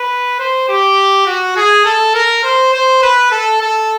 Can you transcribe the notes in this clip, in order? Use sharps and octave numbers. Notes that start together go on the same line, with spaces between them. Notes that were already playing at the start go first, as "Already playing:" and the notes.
Already playing: B4
C5
G4
F#4
G#4
A4
A#4
C5
C5
B4
A4
A4